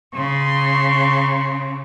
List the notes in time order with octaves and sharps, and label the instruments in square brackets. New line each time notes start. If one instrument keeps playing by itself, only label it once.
[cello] C#3 [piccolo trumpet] C6